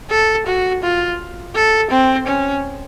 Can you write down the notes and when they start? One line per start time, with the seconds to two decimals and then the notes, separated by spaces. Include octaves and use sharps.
0.10 A4
0.47 F#4
0.83 F4
1.55 A4
1.91 C4
2.27 C#4